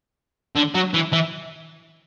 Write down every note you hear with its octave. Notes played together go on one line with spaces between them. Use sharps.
D3
F#3
E3
E3